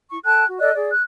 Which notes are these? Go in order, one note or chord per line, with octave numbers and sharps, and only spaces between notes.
E4 C#6
A4 G5 A5 F#6
F#4
A4 D5 D#5 F#6
G#4 D5
F#6